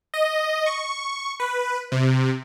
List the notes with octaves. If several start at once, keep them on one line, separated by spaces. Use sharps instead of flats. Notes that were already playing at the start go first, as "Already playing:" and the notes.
D#5
C#6
B4
C3